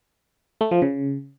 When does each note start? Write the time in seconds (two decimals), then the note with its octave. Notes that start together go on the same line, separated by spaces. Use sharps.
0.61 A3
0.71 F3
0.82 C#3